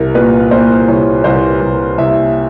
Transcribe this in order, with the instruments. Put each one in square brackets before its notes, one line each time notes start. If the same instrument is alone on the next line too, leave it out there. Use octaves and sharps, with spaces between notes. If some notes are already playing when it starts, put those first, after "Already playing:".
Already playing: [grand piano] C2 A#4
A#2 B4
A#2 C5
C2 C#5
C2 C5
C2
C2 E5